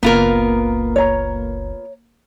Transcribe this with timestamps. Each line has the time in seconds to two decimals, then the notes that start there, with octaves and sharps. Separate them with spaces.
0.03 F#1 C#2 A#3 B3 F4 A#4
0.96 C#5 A#5